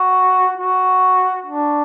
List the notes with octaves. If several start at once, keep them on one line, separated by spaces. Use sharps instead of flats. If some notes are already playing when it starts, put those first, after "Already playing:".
Already playing: F#4
F#4
D4